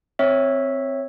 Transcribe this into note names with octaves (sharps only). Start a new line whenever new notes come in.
C4 C#5 E5